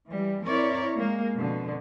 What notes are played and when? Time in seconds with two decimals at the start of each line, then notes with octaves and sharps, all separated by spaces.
0.11 E3 G3
0.45 C4 E4 A#4 C#5 D5
0.97 G#3 A#3
1.37 F2 B2 D3